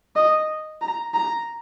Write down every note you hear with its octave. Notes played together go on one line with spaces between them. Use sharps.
D#5
A#5
A#5